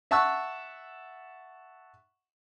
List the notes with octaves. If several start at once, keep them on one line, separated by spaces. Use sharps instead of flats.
E5 F#5 A5 C#6 E6 F#6